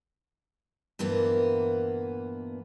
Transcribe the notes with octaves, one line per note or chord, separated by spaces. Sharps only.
G2 A#2 E3 A#3 B3